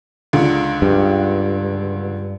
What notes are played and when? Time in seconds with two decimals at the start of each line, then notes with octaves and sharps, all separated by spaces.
0.33 C#2 D3
0.82 G2